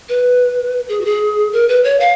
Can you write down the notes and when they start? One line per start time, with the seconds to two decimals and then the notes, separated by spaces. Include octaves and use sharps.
0.09 B4
0.89 G#4
1.01 F#4
1.05 G#4
1.53 A#4
1.69 B4
1.84 C#5
2.00 F5